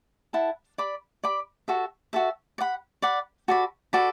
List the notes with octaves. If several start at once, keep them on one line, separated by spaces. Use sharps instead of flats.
E4 A4 F#5 A5
D5 B5 D6
D5 B5 D6
F#4 A4 E5
F#4 A4 E5
D5 F#5 B5
D5 F#5 B5
F#4 A4 D5 B5
F#4 A4 D5 B5